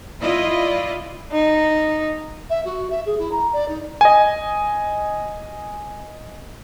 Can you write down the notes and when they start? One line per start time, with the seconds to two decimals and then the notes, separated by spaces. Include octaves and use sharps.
0.21 E4 F4 D5 D#5
1.31 D#4
2.49 E5
2.65 F#4
2.90 E5
3.05 G#4
3.18 E4
3.31 A#5
3.52 D5
3.68 D#4
4.01 D#5 G#5